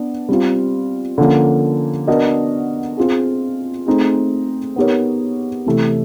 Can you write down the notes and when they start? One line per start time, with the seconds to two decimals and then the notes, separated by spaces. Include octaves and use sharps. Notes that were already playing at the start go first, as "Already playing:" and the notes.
Already playing: B3 D4
0.29 G3 C4 F4
1.18 D3 F3 A#3 C#4
2.07 B3 D4 F#4 A#4 D#5
2.97 C4 F4 G#4
3.87 A3 C4 D#4 G#4
4.76 B3 D#4 G4 A#4 C#5
5.66 C3 E3 A3